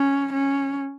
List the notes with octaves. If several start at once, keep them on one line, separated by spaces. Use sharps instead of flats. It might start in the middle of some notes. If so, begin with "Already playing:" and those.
Already playing: C#4
C#4